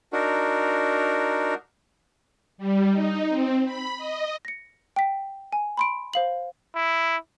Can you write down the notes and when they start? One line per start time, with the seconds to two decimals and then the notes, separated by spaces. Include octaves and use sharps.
0.13 D4 D#4 F#4 A#4
2.58 G3
2.91 D#4
3.29 C4
3.65 B5
3.97 D#5
4.45 A#6 C#7
4.96 G5 B6
5.53 G#5
5.77 B5 C6 D7
6.14 C5 F5 F#7
6.75 E4